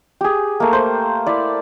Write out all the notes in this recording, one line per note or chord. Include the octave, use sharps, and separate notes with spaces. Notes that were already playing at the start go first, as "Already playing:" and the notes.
G4 G#4
A3 A#3
C5
E4 D5